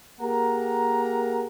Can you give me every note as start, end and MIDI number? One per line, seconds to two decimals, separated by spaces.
0.21 1.47 58
0.21 1.47 67
0.21 1.47 68
0.21 1.47 70
0.21 1.47 78
0.21 1.47 82